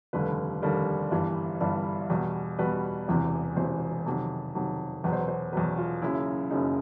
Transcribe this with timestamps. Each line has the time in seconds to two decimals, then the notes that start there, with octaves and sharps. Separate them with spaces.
0.13 F1 D#2 D3 G3 B4
0.62 F1 D#2 D3 G3 A#4
1.11 G1 G2 E3 G3
1.61 G1 G2 E3 G3
2.10 E2 B2 G3
2.59 E2 B2 G3 B4
3.08 E1 E2 C3 E3
3.56 E1 E2 C3 E3 C5
4.06 F2 C3 D#3 F#3
4.55 F2 C3 D#3 F#3
5.04 E2 B2 F#3 B4
5.13 C5
5.20 B4
5.28 C5
5.52 E2 B2 F#3 B4
5.78 F4
6.02 F#1 F#2 C#3 E4
6.51 F#1 F#2 C#3 D#4